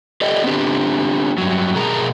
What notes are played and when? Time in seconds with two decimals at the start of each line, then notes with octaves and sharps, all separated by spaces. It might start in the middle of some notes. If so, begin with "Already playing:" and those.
0.21 G4 A4 D5 D#5
0.44 B3 C4 D4 G4
1.38 G2 F#3
1.75 B2 G#4 A#4 A#5